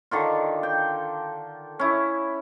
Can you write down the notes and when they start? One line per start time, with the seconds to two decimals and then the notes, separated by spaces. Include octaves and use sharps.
0.11 D3 D#3 F4
0.63 G5
1.79 C#4 E4